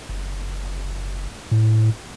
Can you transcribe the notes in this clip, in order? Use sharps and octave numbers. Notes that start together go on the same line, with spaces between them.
F#1
A2